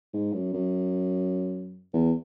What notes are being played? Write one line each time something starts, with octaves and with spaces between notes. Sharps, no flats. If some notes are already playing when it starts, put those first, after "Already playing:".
G#2
F#2
F#2
E2